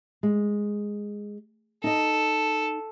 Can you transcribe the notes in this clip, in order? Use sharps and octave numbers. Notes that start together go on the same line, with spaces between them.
G#3
D#4 A4 D#5